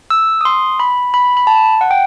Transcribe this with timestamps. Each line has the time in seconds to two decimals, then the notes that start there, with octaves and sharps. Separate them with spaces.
0.10 E6
0.41 D#6
0.45 C6
0.80 B5
1.14 B5
1.37 B5
1.47 A5
1.81 F#5
1.91 G5